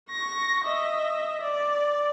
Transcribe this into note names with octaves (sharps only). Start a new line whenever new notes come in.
C#6 A#6
D#5 E5
D5